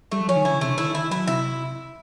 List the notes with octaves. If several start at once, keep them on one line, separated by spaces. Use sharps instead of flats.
G3 A3
F#3
F3 C#4
D#3
D3 E4
C#3
C3 A3
D3
D#3 E4
E4
F#3 E4
C3 E4